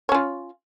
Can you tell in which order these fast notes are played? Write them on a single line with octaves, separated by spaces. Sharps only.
C#5 C#4 F4